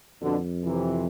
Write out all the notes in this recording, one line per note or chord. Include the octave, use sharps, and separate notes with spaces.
F2 B2 D3
C3 E3